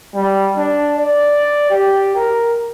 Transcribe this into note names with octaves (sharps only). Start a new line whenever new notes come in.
G3
D4
D5
G4
A#4